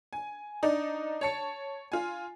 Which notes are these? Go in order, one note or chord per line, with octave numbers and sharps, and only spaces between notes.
G#5
D4 D#4 D5
C#5 A5 C#7
F4 G#5